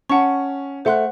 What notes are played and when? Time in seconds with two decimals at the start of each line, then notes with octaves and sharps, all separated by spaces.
0.09 C#4 F#5 A5 C#6
0.85 A3 C5 F#5 C6 F#6